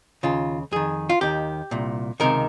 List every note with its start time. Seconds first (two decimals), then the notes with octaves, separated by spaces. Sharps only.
0.23 D#2 C#3 F4
0.72 F2 D#3 G#4
1.09 F4
1.21 D#2 D#3 G4
1.71 C2 A#2
2.20 C#2 C3 D#3 A#4